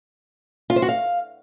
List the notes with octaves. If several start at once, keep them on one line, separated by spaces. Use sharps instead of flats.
F4
C5
F#4
F5